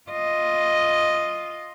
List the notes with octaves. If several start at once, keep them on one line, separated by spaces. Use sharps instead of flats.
F4 D#5